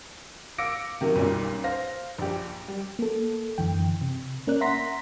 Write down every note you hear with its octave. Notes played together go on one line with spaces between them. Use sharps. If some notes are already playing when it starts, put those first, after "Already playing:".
F5 D6 E6 A#6 C#7 D7
C3 D#3 F#3 A#3
B1 F#2 A#2 G3
C5 F5 A#6
A#1 G4
G3
A#3 A4
F#2 D3 E3 G5
C3
A#3 C#4 A#4 D5 F#6
E5 F#5 A#5 C6 A#6 B6